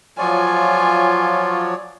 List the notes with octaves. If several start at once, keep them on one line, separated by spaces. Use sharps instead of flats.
F3 F#3 F4 C#5 D5 G#5